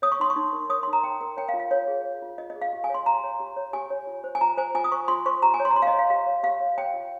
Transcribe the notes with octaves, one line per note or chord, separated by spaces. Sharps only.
C#5 D#6
C#6
D#4 C6
C#6
D#4
A#4
C#5 D#6
C6
D#4
A#5
D#4 G5
A#4 G5
C#5 G5
F5
F4
F5
F4 C#5
G#4
C#5
F4
F4 D#5
D#5
G#4
F5
G4
G#5
C#5
C6
G4 A#5
C#5
G4
C#5
G4 G#5
C#5
F4
C5
G#5
F4 A#5
C5 G#5
F4 G#5
D#6
C5 C#6
F4 C6
C5 C#6
G4 A#5
G#5
C#5
C6
A#5
G4 C6
F5
D#5
C#5
F5
G4 F5
C#5
G4 F5
C#5
C#5 G5
F4